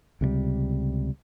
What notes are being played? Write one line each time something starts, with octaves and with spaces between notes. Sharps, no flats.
C#2 C3 D#3 G3